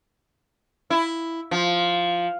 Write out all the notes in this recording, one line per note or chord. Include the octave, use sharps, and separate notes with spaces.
E4
F3